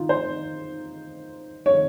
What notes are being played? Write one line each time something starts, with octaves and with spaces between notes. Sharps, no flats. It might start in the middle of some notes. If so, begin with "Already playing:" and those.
Already playing: D#3 D#4 F4
C5
C#5